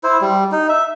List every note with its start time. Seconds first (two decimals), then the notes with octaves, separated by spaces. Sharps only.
0.03 E4 C5
0.21 G3
0.52 D#4
0.69 E5